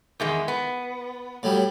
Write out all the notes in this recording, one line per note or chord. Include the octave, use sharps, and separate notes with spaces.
E2 D#3 G#3
B3
A2 F#3 G3